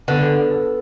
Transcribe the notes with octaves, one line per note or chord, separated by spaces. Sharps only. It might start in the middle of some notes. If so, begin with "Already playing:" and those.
D3 B3
A4